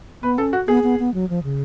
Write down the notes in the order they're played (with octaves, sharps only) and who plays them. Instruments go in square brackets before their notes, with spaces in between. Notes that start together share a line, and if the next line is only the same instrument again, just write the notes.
[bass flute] B3 [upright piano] B4
[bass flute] C#4 [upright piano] A4
[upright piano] F#4
[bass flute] B3 [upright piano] G#4
[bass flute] B3
B3
F#3
F3
C#3